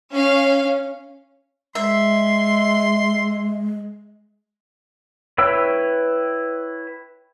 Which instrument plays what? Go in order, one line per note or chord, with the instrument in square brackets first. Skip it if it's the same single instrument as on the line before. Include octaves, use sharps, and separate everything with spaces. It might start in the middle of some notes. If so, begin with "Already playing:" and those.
[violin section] C#4 F5
[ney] G#3 [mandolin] E5 [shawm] C6
[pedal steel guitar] E4 B4 C#5 G5 E6